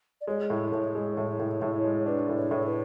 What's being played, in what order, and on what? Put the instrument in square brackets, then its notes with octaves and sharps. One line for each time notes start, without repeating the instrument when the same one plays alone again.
[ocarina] D5
[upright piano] G#3 [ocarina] C#5
[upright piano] A2
A2
G#3
[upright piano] A2 [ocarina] C#5
[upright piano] A2
A2
G#3
[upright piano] D4 [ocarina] B4
[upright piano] A2
[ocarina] C#5
[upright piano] A2
[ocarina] B4